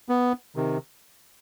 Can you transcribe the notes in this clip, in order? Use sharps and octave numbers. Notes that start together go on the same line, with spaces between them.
B3
C3 D#3